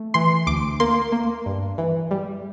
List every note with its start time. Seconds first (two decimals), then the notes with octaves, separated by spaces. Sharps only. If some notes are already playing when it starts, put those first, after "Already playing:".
Already playing: A3
0.14 E3 C6
0.47 D2 D6
0.80 A#3 C6
1.12 A#3
1.46 G2
1.78 E3
2.11 G3